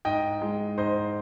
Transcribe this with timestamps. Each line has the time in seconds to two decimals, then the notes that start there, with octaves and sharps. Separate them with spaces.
0.05 G#2 D#5 G5
0.42 G#3
0.78 G#2 C5 D#5